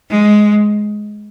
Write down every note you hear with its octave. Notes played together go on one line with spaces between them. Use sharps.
G#3